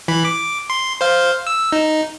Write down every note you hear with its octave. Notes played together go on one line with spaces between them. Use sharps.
E3 B5
D6
C6
C5 F5
E6
D#4